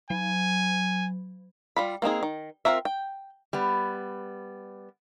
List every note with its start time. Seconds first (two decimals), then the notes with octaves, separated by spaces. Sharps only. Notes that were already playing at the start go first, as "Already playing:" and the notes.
0.10 F#3 G#5
1.76 G3 F4 B5
2.02 A#3 C4 D#4 G#4
2.23 D#3
2.65 C4 F4 A#4 E5
2.85 G5
3.53 G3 B3